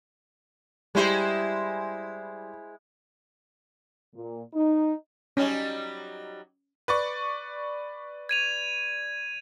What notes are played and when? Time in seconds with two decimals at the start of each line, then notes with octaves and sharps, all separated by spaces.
0.95 G3 G#3 E4 C5
4.14 A#2
4.54 D#4
5.37 F#3 G3 C#4 D#4
6.88 B4 D5 C#6
8.29 G#6 D#7 F7